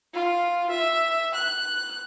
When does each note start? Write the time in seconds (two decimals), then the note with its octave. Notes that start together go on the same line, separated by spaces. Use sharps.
0.13 F4
0.70 E5
1.34 F#6